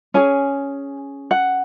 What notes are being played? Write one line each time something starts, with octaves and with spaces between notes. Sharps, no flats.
C#4 G#4 G#5
F#5